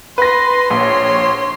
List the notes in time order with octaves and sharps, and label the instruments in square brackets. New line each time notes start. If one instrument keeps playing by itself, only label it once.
[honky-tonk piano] B4 A#6 [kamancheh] C6
[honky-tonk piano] A#1 [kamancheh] C#5 C6